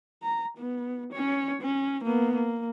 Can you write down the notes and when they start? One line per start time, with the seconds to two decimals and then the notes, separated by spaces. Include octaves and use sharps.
0.23 A#5
0.58 B3
1.13 C#4 C#5
1.62 C#4
2.04 A#3 B3
2.34 A#3